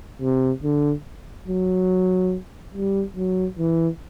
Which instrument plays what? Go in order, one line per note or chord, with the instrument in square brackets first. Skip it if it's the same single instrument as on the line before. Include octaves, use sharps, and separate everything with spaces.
[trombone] C3
D3
F#3
G3
F#3
E3